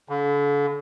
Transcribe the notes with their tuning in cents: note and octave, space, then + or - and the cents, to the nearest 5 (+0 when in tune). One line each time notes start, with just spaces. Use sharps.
D3 -40